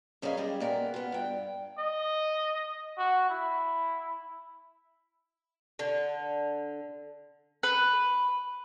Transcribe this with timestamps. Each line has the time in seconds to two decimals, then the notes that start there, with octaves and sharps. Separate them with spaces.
0.22 F#2 C#4 G#4 B4 D#5 F5
0.37 G3 G4 G#4 D#5
0.60 A#2 A#3 B3 A#4 G5 G#5
0.94 B3 F4
1.12 G2 G5
1.79 D#5
2.98 F#4
3.29 E4
5.79 D3
7.63 B4